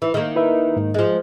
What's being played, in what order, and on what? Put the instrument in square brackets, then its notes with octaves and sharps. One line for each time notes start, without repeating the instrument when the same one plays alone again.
[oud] E3
D#3 A#3
[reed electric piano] E4 B4 E5
G#2
[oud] F3 G#3